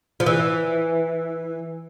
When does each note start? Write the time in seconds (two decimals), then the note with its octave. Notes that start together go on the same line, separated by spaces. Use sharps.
0.20 F3
0.26 E3